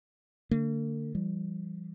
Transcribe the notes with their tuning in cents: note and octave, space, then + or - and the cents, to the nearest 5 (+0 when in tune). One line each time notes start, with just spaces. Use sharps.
D3 -10 A#3 -45
E3 +45 G3 +0